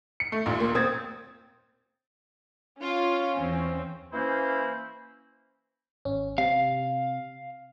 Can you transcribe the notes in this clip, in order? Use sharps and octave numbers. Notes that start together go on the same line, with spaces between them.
C#7
A3
A#1 D#2 A#2
A#3
C4 D#6 G#6 A6
C#4 F4
E2 C4
E3 A#3 C#4 E4 C5
G#1 C#4
C3 F5